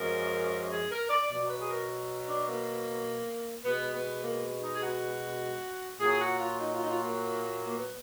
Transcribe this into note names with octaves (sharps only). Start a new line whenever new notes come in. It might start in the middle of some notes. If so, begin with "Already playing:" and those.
Already playing: F#2 F3 G#3 A#4
G#4
A#4
D5
B2 F#3 D5
B4
G#4
A#4
D4
A#3
B2 G#3 B3
B3
A#3
D#4
G#4
F#4
A#2 F#3 G#4
F#4
F4
D#4
F4
D#4
F4
A#3
A#3
B3